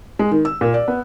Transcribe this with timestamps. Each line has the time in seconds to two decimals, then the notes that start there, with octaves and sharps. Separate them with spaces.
0.19 G#3
0.31 D#3
0.45 E6
0.61 A#2
0.74 D5
0.88 B3